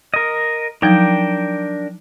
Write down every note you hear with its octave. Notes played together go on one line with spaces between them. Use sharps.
A#4 D#5
F3 F#3 D4 D#4 A#4 G5